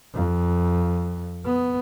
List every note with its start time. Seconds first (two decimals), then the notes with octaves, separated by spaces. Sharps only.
0.15 F2
1.46 B3